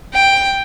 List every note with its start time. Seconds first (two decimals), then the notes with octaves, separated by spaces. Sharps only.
0.14 G5